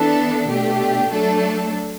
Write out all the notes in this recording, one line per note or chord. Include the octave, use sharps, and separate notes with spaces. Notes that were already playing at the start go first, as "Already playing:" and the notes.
Already playing: E3 B3 D4 A4
B2 A3 D4 G4
F#3 A3 D4 A4